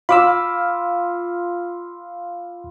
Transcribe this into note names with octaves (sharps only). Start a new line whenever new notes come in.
F4 B5 D6 E6